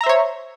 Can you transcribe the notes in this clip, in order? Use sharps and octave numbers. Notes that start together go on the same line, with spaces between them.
C5 C#5 E5 A#5